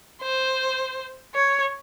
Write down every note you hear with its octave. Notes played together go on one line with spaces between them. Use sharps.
C5
C#5